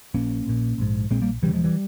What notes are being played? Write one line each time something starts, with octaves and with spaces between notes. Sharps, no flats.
A#1 A#2 A#3 C#4
A#1 A#2
A#1 G#2
A#1 A#2 G#3 C4
G3 A#3
E1 E2 C#3 E3 G3
F3 G#3
E3 G3